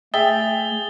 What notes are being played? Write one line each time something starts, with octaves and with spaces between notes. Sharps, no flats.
A3 G#4 E5 G5 D#6 A6 G7